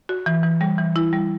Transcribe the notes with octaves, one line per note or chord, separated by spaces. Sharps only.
F#4
E3
E3
G3
E3
E4
G3